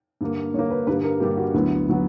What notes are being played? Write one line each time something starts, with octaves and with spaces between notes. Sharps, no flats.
G2 D3 A#3
G2 D3 A#3 C#5
B4
G2 D3 G3 A#3 B4
A#4
G2 D3 G3 A#3 G4
F#4
D2 D3 F#3 B3 E4
D3 F#3 B3